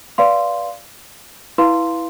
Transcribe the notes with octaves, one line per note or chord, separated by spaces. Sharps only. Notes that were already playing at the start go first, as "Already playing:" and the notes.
B4 D5 F5 C6
E4 B4 F5 C6